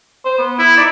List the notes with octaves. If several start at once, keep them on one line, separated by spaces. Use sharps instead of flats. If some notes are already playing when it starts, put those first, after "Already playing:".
C5
B3
E4
D#4 D5